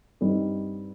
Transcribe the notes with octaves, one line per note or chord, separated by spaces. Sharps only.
G2 G3 C4 D#4